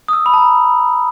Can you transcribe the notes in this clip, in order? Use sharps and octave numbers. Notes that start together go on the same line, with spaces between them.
D#6
E6
B5
A5
A#5